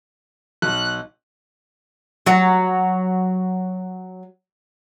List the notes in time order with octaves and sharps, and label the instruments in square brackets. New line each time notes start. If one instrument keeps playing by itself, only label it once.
[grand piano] B1 [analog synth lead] F#6
[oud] F#3 F#4